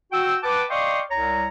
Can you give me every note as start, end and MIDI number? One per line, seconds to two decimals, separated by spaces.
0.13 0.38 66
0.13 0.38 79
0.13 0.38 88
0.44 0.64 71
0.44 0.64 78
0.44 0.64 79
0.44 0.64 81
0.44 0.64 86
0.70 1.01 74
0.70 1.01 75
0.70 1.01 77
0.70 1.01 79
0.70 1.01 84
0.70 1.01 85
1.10 1.48 36
1.10 1.48 73
1.10 1.48 82